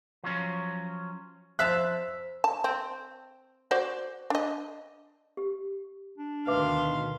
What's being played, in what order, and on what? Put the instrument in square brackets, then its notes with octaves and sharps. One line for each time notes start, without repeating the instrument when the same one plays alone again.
[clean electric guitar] F3 F#3 C#4
[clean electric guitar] F2 [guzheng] C5 F5 A5 [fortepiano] E5 F#6
[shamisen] A5
C4
F#4 C5 D5
D4 D#5
[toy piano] G4
[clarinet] D4
[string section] D2 B2 D#3 [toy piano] B4 E5 D6 [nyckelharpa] F5 C6